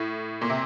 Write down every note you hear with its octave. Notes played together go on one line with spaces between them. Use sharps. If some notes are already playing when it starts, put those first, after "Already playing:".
Already playing: A2
A#2
C3